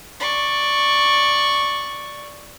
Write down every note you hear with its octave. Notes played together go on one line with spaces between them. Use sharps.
D5 C#6